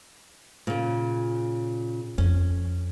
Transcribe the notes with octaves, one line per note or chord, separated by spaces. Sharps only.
A#2 C#3
F2 C#4